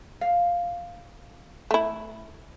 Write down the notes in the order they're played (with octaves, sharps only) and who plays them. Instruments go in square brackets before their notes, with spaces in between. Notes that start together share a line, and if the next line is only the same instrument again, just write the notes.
[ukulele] F5
[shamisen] A3 E4